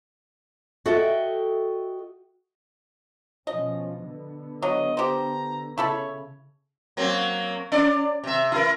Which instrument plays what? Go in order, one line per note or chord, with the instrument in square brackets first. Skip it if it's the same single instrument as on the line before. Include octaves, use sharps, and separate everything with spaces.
[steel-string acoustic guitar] F#4 A4 D#5 E5 G5
[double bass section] B2 F3 C#4 [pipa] D#5
[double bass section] D3 B3
[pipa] F#3 [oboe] D#5
[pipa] G4 C5 [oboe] A#5
[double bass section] C#3 [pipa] E4 A4 B5 [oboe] C#5
[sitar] F#3 A#3 C4
C#4 D5
C3 E5
E4 A#4